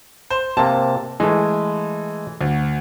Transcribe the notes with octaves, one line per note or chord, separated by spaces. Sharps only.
C5
C3 A#3 A5
E3 G#3 A3
D2